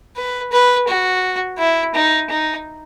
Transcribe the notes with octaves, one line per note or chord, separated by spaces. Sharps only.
B4
B4
F#4
E4
D#4
D#4